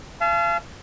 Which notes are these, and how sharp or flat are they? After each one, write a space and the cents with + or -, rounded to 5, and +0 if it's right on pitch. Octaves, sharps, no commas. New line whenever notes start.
F5 -35 A5 -40